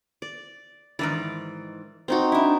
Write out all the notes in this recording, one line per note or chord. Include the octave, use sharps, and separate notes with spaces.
D5
G#2 D#3 E3 D5
C4 D#4 F#4
D4 E4